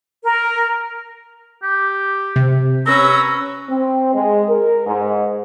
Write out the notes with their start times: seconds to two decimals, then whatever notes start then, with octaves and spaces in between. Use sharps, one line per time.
0.24 A#4
1.63 G4
2.36 C3
2.86 C#4 B4 A#5 E6
3.70 C4
4.14 G#3
4.49 A#4
4.86 G#2